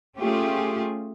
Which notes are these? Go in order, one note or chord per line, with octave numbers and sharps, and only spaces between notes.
A3 C#4 F4 G4 G#4